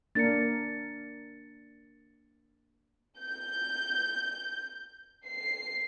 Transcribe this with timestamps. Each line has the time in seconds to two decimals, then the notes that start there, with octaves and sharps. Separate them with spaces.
0.15 A#3 D4 A#4 A6 C#7
3.19 G6
5.25 C7